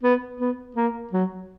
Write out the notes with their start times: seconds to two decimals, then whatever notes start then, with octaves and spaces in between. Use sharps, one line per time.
0.03 B3
0.40 B3
0.76 A#3
1.13 F#3